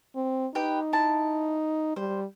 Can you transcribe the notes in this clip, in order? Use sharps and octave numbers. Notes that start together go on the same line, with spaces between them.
C4
D#4 G4 B4 G5
E4 A5
G3 C5